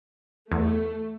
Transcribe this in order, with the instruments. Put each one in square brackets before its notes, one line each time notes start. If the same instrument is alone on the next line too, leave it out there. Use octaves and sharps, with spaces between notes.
[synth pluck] E2 [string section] A3